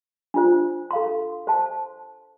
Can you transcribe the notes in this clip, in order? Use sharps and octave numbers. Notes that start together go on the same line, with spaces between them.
D4 F4 C5
A4 F5 C6
C5 A5 C6